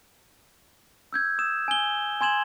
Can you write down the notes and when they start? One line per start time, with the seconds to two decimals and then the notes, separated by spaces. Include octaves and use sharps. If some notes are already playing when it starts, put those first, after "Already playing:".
1.13 E6 G6 G#6
1.38 D#6 E6 E7
1.68 G#5 G7
2.21 G#5 C6 G#6 E7 F#7